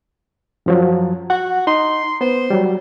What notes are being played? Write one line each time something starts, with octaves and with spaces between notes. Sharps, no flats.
F#2 F3 F#3
F#4 F#5
D#4 C6
B3 C5
F#3 G3